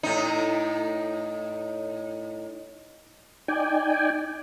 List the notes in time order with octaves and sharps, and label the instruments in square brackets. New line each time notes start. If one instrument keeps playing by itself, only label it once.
[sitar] A2 D#4
[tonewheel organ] D#4 D5 G5 G#5